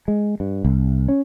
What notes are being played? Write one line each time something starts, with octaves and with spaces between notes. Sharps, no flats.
G#3
G2
C2
C#4